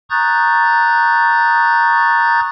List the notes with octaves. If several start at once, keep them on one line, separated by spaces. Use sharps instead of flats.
A#5 C#6 D#6 F#6 G6 A6